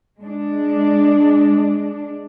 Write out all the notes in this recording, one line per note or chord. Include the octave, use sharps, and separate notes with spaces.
G#3 D4